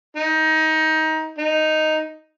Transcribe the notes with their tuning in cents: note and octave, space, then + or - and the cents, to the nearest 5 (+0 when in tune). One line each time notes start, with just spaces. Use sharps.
D#4 +20
D#4 +0